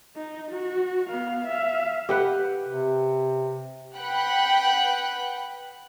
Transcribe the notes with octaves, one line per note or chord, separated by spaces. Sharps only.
D#4
F#4
B3 F5
E5 F5
G4 B4 F#5
C3
B4 F#5 G5 B5 F#6